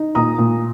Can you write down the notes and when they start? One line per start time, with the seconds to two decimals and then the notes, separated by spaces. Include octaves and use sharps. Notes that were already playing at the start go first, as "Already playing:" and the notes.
Already playing: D#4
0.15 A#2 A#5 D#6
0.38 A#2